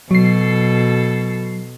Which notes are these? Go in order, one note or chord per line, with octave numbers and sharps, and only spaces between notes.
B2 F#3 A4 C7